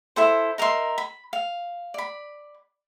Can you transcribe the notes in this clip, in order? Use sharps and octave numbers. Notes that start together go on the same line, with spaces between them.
E4 A4 C5
D#4 A#4 E5 C6
B5
F5
D5 B5